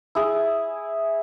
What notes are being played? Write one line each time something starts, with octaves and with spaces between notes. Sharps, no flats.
E4 G#4